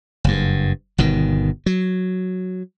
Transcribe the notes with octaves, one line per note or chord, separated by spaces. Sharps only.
F#1 G2
G1 B2 D#3
F#3